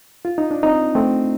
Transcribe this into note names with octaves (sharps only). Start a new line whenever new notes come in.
F4
D#4
D4
C4 D#4
A3 C4